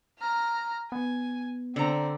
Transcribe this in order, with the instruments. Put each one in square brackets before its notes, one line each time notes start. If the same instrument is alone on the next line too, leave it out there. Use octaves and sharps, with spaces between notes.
[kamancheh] A#5 F6
[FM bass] B3 [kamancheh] G#5
[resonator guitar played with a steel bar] D3 A#5 [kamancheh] C4